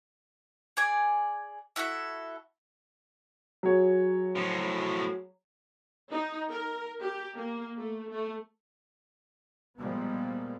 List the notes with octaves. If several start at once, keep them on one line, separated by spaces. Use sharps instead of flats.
G#4 D5 G#5
E4 F#4 A4 E5
F#3 G#4 C#5
A2 F3
D#4
A#4
G4
A#3
A3
A3
A#2 F3 G3 G#3 A#3 B3